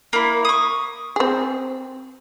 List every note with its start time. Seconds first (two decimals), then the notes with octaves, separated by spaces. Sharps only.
0.13 A#3 E4
0.45 C#6 D#6
1.16 C4 G#4